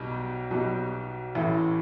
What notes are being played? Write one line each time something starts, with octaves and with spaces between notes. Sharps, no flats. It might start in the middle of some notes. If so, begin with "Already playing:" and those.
Already playing: B1 B2 G3 D#4 G4
B1 B2 G3 D#4 G4
A1 A2 E3